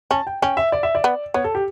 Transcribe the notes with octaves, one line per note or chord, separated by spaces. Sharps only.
C#4 A5
G5
C#4 G5
E5
D5
E5
D5
B3
B3 C#5
A4
G4